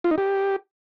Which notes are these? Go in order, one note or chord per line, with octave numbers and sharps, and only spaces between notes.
F4
D#4
G4